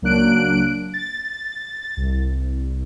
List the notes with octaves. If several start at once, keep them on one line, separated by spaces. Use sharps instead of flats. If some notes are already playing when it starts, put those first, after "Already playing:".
C#2 F#3 A#3 D4 F#6 D7
A6
C2